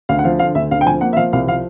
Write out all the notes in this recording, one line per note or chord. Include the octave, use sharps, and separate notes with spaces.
D2 F5
F#5
F3 F5
D3 F5
D2 E5
D2 F5
G5
F3 G#5
A#3 F#5
E5
F3 F5
C2 F5
F3 F5